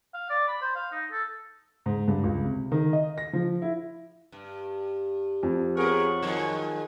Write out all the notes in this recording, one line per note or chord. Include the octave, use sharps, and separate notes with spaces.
F5
D5
B5
C5
F5
D#4
A4
G#2
G2
C#2
C3
D#3
D#5
A#6
F3
E4
G2
F2
B3 G#4 A#4 C#5 F#5 C#6
D#3 F3 F#3 G#3